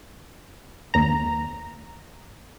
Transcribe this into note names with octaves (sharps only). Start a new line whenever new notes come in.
D#2 A#5